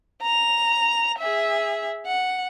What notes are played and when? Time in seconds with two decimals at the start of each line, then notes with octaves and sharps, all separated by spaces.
0.22 A#5 F7
1.19 G#4 E5
2.06 F#5